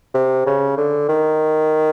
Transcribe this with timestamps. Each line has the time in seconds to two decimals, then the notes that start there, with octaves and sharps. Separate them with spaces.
0.14 C3
0.46 C#3
0.77 D3
1.08 D#3